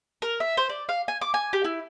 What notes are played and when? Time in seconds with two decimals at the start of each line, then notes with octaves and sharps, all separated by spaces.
0.22 A#4
0.40 E5
0.57 C5
0.69 D5
0.89 F5
1.08 G#5
1.21 D6
1.34 G#5
1.53 G4
1.65 E4